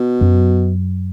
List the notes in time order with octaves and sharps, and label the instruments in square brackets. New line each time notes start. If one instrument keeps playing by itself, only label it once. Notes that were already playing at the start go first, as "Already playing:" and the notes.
Already playing: [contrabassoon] B2
[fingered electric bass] F#2 F#3